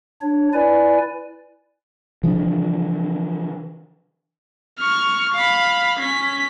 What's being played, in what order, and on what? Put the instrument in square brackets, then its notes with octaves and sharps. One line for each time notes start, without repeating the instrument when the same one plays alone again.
[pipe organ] D4 C#5
E4 B4 D5 G#5
[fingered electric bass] C#3 E3 F3 D4
[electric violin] C#6 F6
F5 B5
C#4 B6